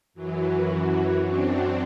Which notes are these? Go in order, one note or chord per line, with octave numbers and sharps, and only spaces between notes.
F#2 E3 F#3
F#2 F#3 C4 D4